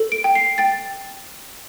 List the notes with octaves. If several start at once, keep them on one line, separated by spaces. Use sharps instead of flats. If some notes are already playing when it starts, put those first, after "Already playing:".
Already playing: A4
D7
G5
C7
G5 A6